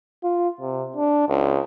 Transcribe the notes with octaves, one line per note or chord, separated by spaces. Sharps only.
F4
C3
D4
C#2